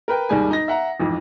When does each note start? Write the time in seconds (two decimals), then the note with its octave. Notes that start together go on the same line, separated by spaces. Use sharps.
0.08 A#4 B4 G5
0.29 D#2 G#2 G3 G#4 G#5
0.51 D#4 A#6
0.68 E5 F#5 A#5
1.00 A1 F2 G#2